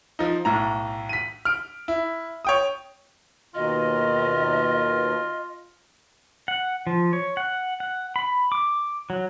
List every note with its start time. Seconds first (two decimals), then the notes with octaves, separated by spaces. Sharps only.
0.19 F3 D#4
0.45 B1 A2 A#5
1.09 B6 D#7
1.45 F6 D7
1.88 E4
2.45 C#5 G5 D#6
3.55 D#2 B2 D#3 F4 D#5
6.48 F#5
6.87 F3
7.13 C#5
7.37 F#5
7.80 F#5
8.16 B5
8.52 D6
9.10 F#3